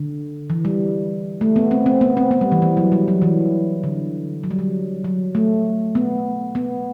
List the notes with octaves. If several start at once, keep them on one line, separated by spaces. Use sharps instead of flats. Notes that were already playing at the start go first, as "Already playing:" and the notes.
Already playing: D3
E3
G3
A3
B3
C4
C4
B3
C4
B3
G3
E3
E3
F#3
G3
F#3
E3
D3
F#3
G3
F#3
F#3
A3
B3
B3